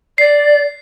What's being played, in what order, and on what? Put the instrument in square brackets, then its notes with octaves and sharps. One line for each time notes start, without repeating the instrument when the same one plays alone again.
[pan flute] D5 [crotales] C7